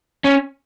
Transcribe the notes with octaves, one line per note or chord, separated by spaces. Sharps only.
C#4